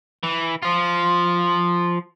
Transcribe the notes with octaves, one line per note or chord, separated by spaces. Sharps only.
E3
F3 F4